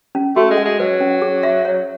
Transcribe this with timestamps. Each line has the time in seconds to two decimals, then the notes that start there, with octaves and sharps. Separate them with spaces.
0.15 C#4
0.36 A3 F#4
0.50 G#3
0.57 F#5
0.65 G#3
0.80 F#3 B4
1.00 C#4
1.22 G#4
1.43 E5
1.65 C#5